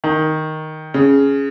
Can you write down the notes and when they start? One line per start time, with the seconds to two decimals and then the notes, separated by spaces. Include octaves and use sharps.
0.04 D#3
0.94 C#3